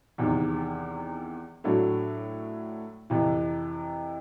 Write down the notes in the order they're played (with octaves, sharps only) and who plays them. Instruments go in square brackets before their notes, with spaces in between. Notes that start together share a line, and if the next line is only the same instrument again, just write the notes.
[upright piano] E2 C3 D#3
A2 F#3 A3 D4
F2 C3 E3